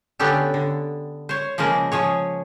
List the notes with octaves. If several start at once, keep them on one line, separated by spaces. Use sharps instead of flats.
D3 B3 C#4 G4 A4
D3
C5 C#5
C#3 F3 G#3 A#3 A#4
F3 G#4 C#5